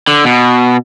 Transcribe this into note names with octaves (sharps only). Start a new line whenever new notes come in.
D3
B2